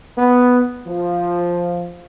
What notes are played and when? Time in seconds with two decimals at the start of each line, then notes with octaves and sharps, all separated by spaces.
0.18 B3
0.87 F3